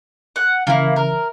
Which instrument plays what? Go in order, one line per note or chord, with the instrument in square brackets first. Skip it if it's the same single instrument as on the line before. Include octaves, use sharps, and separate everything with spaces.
[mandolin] F#5
[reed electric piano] C#3 E3 [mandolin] A#3 E4
[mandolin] A#4